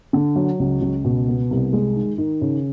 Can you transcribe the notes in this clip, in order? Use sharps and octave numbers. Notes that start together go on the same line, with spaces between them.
D3
F#3
C#2
C#2
B2
B3
C2
G#3
D#3
D#3
C#3